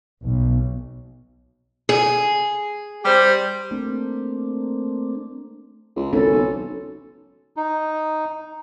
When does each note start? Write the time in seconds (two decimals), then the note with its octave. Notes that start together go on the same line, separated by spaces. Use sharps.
0.24 B1
1.89 G#4
3.05 G3 G4 C5
3.71 A3 A#3 C4 D4
5.96 C#2
6.13 G#1 C#4 A4
6.32 B1
7.56 D#4